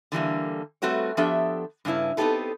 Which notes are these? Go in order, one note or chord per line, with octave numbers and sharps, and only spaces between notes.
D3 E3 G3 A#3
G3 A3 C4 F#4 B4 C#5
F3 B3 D4 G4 A4 E5
G2 C#3 C#4 E4 B4
B3 C4 D#4 G4 A4 B4